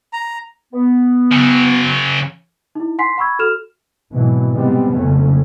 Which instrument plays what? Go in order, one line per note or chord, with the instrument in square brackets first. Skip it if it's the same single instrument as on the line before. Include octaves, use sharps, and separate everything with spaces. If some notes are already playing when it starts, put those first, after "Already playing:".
[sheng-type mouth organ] A#5
[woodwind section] B3
[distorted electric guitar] C#3 F#3
[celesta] D#4 E4
F#5 G#5 C6 B6 C7
F#5 B5 C#6 E6 G#6
F#4 A4 F6 E7 F7
[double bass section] G#1 B2 E3 F#3
C3 D#3 G3 G#3 B3 C4
F#1 F2 C#3 A3 C#4